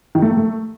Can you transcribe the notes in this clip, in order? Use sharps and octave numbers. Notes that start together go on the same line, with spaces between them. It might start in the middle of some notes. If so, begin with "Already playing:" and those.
D#3
A3
A#3
A3